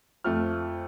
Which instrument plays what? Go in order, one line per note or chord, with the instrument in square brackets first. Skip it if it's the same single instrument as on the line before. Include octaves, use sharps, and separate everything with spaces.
[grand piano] F2 F3 A3 F6